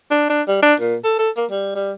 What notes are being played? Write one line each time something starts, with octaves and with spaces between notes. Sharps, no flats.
D4
D4
G3
D4
A#2
A4
A4
A#3
G3
G3